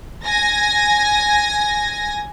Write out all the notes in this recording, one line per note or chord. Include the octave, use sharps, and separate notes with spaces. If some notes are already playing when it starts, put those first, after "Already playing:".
G#5 A#6